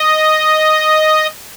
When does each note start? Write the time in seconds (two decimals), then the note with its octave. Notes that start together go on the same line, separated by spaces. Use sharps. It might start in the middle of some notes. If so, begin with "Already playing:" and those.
Already playing: D#5